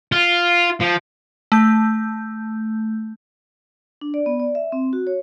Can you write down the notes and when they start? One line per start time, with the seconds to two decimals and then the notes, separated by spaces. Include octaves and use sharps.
0.12 F4
0.80 F3
1.52 A3 G6
4.01 D4
4.14 D5
4.26 B3
4.40 D5
4.55 E5
4.72 C4
4.93 F#4
5.07 C#5